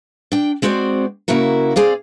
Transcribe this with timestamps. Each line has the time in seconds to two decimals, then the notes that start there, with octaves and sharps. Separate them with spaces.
0.32 D4 G5
0.62 G#3 C4 F#4 C5 D5
1.28 C#3 A#3 E4 F#4 A#4
1.76 C4 G#4 D5 F5